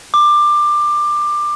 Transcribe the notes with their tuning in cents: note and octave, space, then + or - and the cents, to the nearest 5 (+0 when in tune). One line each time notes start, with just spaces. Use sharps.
D6 +20